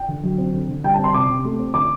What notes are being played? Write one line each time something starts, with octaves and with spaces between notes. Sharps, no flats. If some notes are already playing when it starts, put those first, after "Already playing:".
Already playing: G5
D3
F#3
C4
D3
D3
G3 G5
A5
C4 C6
C3 D6
C3
A3
C4
D3 D6